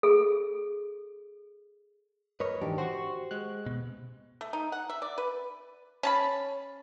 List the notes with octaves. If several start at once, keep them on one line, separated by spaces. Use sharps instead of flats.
G#4 A4
A#4 B4 C#5 D#5
G#2 D#3 E3 D4 G4
F#4 C5 C#6
G#3 F#6
B2
A3
D#4
F#5
E5
D5
B4
C#4 A5 B5